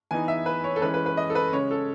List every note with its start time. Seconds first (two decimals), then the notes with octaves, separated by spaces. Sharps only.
0.11 E3 B3 D#4 G#5
0.28 E5
0.46 B4
0.64 C#5
0.76 A4
0.82 E3 G#3 C#4 B4
0.94 B4
1.06 B4
1.17 D#5
1.30 A4
1.35 B4
1.53 C#3 G#3 C#4 C#5
1.71 A4